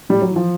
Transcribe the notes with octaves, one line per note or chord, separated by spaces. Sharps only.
A2 G3
F#3
E3
F3